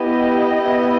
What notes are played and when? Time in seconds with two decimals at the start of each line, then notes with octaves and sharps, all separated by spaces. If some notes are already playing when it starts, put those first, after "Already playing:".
Already playing: B3 E4 G4 D#5
0.61 B3 E4 G4